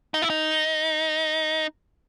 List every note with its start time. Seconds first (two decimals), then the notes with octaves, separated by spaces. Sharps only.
0.14 D#4
0.22 E4
0.30 D#4